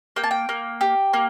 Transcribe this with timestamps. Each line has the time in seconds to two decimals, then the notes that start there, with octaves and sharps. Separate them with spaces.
0.16 A#3 G5
0.24 A5
0.31 G5
0.49 A#3
0.81 G4
1.13 A#3